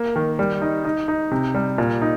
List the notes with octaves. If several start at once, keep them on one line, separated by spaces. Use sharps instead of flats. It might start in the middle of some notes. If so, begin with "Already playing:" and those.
Already playing: A#3
D#3
G3
D#4
D#4
D#4
C3
G3
A#2
D#4